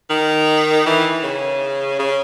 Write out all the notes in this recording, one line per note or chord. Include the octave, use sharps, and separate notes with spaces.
D#3
E3
C#3
C#3